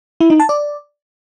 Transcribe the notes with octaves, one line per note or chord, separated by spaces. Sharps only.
E4
D#4
A5
D5